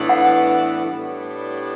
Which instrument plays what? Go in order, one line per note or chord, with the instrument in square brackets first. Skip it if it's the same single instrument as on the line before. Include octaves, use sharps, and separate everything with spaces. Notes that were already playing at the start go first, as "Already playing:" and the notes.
Already playing: [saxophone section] A2 E3 B3 D4
[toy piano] F#5
[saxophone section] A2 G3 B3 D4